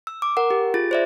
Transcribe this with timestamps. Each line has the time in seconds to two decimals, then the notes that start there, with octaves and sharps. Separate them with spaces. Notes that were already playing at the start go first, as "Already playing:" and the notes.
0.07 E6
0.22 D6
0.37 A#4 F#5
0.50 G4
0.74 F4 G#4 A6
0.91 C5 D5 E5